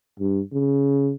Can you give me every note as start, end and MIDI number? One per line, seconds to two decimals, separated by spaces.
0.20 0.40 43
0.53 1.13 49